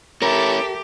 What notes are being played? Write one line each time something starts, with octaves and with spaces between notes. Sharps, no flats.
C#4 E4 G4 A4 A#4 E5